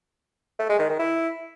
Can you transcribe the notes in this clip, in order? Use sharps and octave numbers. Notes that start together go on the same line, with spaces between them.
A3
G#3
D#3
D#3
E4